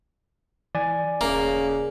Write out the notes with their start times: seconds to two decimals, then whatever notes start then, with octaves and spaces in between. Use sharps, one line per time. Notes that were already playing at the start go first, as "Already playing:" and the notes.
0.75 E3 D5 G#5
1.21 D#1 C#3 A#3